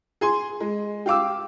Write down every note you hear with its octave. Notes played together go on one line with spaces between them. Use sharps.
G#4 G#5 C6
G#3
G4 F5 D6 E6